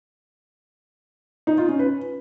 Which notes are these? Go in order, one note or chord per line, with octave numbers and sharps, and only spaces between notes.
D#4
F4
C#4
B4